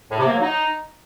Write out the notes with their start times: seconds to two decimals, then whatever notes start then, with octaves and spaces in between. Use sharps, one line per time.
0.11 A2
0.19 C3
0.26 A#3
0.34 F#3
0.41 D#4